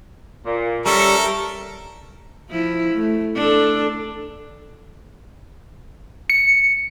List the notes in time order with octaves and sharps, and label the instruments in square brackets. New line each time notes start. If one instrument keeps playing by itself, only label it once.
[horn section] A#2
[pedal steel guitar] G3 [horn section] C#4 E5 [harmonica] A4 A#4
[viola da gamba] F3 E4
A3
D4 A4
[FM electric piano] C#7